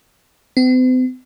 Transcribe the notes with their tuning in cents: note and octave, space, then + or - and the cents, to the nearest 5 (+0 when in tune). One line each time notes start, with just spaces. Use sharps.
C4 -45